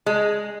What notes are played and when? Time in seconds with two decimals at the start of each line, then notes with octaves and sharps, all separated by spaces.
0.06 G#3